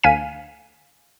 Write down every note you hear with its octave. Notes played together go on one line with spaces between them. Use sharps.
D2 F5 G#5 B6 D#7